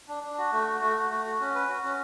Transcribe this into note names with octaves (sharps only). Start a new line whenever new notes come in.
D4
D4
F#4
A3
F#4
A3
F#4
A3
F#4
C#4
B4
F#4
C#4